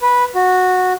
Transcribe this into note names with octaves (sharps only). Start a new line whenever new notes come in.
B4
F#4